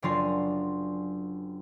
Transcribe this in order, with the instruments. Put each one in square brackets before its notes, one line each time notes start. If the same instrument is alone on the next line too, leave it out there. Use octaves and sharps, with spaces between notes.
[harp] F#1 F#3 D4 F4 G#5 C7